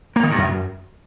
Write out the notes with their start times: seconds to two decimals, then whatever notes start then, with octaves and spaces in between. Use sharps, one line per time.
0.16 A#3
0.23 D#3
0.31 G2
0.38 F#2